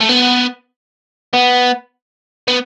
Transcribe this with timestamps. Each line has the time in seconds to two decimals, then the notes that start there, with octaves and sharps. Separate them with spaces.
0.01 A3
0.09 B3
1.34 B3
2.48 B3